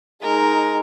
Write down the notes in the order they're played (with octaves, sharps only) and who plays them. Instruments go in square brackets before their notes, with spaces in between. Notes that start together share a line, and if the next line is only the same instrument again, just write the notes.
[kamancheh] G#3 D#4 [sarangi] A#4